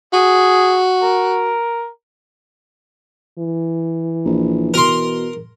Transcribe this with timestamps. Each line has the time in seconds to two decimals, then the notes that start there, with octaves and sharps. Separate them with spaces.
0.13 F#4 G#4
1.02 A#4
3.39 E3
4.25 A#1
4.74 B2 A#4 C6